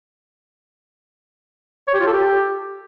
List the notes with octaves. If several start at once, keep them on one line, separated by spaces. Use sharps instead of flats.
C#5
G4
F4
A4
G4